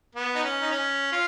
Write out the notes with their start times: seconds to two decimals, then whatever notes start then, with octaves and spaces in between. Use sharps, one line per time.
0.15 B3
0.35 D#4
0.43 C#4
0.62 D#4
0.71 C#4
1.12 F4